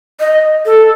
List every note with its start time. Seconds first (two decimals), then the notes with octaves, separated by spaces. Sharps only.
0.20 D#5
0.66 A4